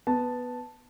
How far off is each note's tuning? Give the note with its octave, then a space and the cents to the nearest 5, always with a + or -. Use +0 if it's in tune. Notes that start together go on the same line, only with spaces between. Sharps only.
B3 +0 A5 +0